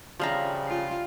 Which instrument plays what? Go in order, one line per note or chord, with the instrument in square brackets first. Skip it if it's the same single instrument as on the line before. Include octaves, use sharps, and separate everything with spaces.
[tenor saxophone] C#3 [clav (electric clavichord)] F3 F5 A#5 [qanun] G3 D4 E5
[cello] F4